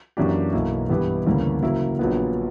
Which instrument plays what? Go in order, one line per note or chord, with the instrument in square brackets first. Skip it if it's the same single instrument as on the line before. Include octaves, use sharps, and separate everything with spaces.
[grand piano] F#2 E3 A#3 D4 G4
B1 B2 A#3 E4
G2 E3 B3 E4 G4
D2 C#3 E3 G3 A#3
C#3 F#3 A#3 E4
A#1 A#2 F#3 B3